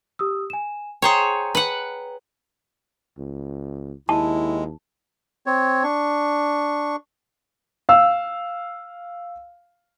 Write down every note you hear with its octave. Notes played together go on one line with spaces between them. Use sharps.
G4 D#6 E6
G#5 E7
G#4 C5 C#5 G5 A#5 C#7
B4 F#5
C#2
D#2 G#3 E4 A5
C4 C#5
D4 C#6
F5 E6